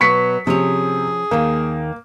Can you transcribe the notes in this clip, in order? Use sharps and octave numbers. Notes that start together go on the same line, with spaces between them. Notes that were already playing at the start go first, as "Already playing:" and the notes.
B2 F#3 B4 C#6 B6 C#7
C3 F3 C#4 G#4 C#5
D#2 D#3 A#3